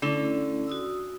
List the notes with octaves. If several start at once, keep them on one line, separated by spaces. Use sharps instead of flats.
D3 A3 C#4 E4
F#4 D#6 E6